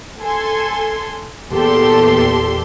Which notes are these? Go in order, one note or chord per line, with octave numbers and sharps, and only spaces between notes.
A4 G#5 C6
E2 A#2 G4 A4 C6